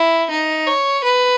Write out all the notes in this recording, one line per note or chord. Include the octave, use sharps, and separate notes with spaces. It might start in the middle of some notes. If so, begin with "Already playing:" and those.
Already playing: E4
D#4
C#5
B4